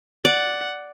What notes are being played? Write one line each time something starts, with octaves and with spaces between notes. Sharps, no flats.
D5 F#5